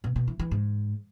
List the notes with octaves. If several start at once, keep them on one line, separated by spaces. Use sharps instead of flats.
B2
B2
E3
E3
G#2